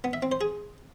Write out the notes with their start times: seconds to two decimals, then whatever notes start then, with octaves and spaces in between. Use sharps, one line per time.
0.04 B3
0.13 E5
0.22 C4
0.32 C5
0.41 G#4